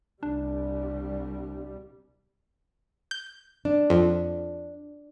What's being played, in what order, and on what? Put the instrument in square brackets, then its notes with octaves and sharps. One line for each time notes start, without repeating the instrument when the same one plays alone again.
[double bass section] C2 G3 [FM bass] D4
[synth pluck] G6
[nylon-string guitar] D4
[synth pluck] F2